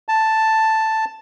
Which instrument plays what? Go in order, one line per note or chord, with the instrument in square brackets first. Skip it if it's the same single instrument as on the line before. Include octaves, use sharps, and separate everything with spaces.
[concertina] A5